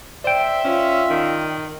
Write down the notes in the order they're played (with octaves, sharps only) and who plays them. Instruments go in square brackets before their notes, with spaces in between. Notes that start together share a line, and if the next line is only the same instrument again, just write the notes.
[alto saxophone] C5 [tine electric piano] D5 G5 [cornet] E5
[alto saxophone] C#4 [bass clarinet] F4
[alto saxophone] D#3